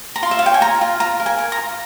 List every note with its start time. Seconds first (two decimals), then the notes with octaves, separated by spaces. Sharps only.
0.16 A#5
0.23 F4 C6
0.31 E5
0.39 F5
0.43 C#5 G5
0.54 G#5
0.61 F4 A#5
0.81 F4
1.00 F4 A#5
1.20 A#4
1.26 G#5
1.38 A#4
1.52 A#5
1.58 F4